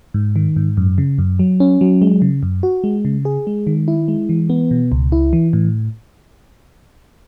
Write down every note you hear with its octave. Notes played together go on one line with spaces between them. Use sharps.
G#2
D#3
G#2
F#2
C#3
F#2
F#3
C#4
F#3
G#3
C#3
F#2
F#4
G#3
C#3
G#4
G#3
D#3
E4
G#3
E3
B3
B2
C#2
E4
E3
A2